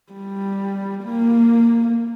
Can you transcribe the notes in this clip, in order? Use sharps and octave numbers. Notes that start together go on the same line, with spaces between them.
G3
A#3